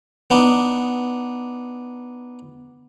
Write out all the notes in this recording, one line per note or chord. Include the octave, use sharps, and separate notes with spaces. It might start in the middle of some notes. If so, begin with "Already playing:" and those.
B3 D4 D#4